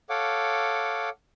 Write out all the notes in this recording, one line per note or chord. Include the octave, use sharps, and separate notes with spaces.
A4 C#5 F5 F#5 D6